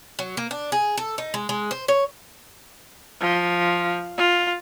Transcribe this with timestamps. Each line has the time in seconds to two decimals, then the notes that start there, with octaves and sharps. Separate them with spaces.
0.19 F#3
0.37 A#3
0.51 D4
0.72 G#4
0.98 A4
1.18 D#4
1.34 G#3
1.49 G#3
1.71 C5
1.88 C#5
3.21 F3
4.17 F4